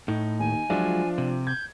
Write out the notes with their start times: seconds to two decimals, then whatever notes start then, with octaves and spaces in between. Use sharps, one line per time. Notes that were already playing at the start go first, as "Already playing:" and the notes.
0.08 A2 D#4
0.39 D#2 G#5
0.70 F3 F#3 G#3 D4 F4 E5
1.18 C3
1.47 G6 G#6